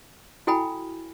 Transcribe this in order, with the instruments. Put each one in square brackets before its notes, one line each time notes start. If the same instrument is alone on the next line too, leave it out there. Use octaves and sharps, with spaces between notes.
[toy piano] E4 F#4 A4 G5 G#5 B5